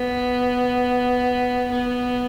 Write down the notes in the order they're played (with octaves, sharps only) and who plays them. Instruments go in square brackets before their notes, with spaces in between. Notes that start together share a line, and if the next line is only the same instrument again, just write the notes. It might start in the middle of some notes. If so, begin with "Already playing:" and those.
Already playing: [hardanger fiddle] B3
B3